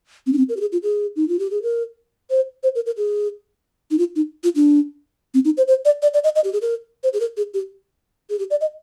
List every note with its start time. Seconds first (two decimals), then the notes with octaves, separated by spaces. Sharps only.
0.27 C4
0.33 D4
0.38 C4
0.49 A#4
0.57 G4
0.61 G#4
0.72 F4
0.83 G#4
1.16 D#4
1.28 F4
1.39 G4
1.51 G#4
1.62 A#4
2.30 C5
2.63 C5
2.75 A#4
2.86 A#4
2.97 G#4
3.91 D#4
3.98 F4
4.16 D#4
4.44 F4
4.56 D4
5.34 C4
5.45 D#4
5.57 C5
5.68 C5
5.85 D5
6.02 D5
6.14 D5
6.24 D#5
6.35 D#5
6.44 G4
6.53 G#4
6.62 A#4
7.03 C5
7.13 G#4
7.20 A#4
7.37 G#4
7.54 G4
8.30 G#4
8.39 G4
8.50 D5
8.61 D#5